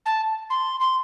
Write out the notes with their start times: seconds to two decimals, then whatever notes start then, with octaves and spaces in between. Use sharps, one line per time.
0.06 A5
0.50 C6
0.80 C6